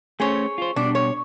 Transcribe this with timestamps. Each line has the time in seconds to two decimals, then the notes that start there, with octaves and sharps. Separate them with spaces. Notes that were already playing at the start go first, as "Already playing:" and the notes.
0.20 A3 C#4 G#4 C5 C#5
0.58 F4 C5
0.76 B2 G3 D4
0.95 C#5